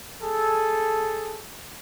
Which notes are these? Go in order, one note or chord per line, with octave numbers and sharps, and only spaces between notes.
G#4 A4